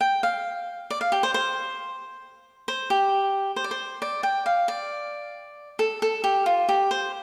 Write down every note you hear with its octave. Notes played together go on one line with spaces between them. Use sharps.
G5
F5
D5
F5
G4
C5
C5
C5
G4
C5
D5
C5
D5
G5
F5
D5
A4
A4
G4
F4
G4
C5